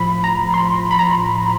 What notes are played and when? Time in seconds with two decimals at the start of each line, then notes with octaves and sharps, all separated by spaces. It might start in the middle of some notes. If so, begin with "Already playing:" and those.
Already playing: A2 F3 B5
0.24 A#5
0.54 C6
0.91 B5
0.99 A#5